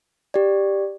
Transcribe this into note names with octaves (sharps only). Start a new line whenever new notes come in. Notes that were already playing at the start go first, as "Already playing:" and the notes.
G4 D5